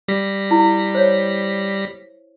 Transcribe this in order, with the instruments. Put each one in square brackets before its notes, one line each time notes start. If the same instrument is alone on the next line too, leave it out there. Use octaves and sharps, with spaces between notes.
[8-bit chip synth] G3 A#6 B6
[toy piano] E4
C5 C#5